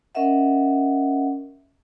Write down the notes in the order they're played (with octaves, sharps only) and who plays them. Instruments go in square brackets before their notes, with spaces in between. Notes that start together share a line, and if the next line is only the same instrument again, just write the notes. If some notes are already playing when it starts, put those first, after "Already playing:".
[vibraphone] C#4 A#4 D#5 E5 F#5